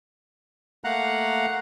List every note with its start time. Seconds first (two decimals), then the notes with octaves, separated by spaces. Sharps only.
0.84 A3 A#3 F5 F#5 A#5 F#6